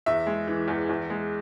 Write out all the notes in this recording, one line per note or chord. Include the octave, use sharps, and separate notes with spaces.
E2 E5
G#3
E3
E2
E2
G#3